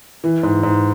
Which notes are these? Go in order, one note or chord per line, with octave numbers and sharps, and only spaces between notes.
E3
G#2
G#2